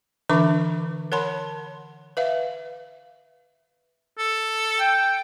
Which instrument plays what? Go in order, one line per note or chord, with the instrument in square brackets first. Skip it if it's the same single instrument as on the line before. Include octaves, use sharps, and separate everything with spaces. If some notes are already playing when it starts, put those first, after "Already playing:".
[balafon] D3 E3 D4 E5 C#6 D6
A#4 C#5 F#5 A5 B5 C6
B4 E5 F5
[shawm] A4
[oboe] G5